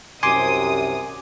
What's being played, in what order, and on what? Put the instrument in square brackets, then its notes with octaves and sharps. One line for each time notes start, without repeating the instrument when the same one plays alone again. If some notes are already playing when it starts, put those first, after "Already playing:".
[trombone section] C2 F#2 C3 [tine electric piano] G#5 C6 D6 [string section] D#6